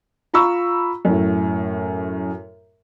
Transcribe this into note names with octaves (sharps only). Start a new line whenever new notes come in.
F4 A#5 B5 C#6 E6
F#2 A2